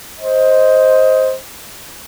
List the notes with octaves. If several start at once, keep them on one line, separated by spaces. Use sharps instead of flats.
C5 D#5